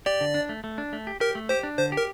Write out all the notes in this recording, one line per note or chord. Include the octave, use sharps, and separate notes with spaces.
G4 D5
D3
D4
A3
A3
D4
A3
G4
G4 A#4
A3
G4 C5
D4
D3 C5
G4
A#4